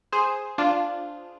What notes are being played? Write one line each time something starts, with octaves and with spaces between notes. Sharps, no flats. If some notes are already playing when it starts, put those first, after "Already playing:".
G#4 C5
D4 F4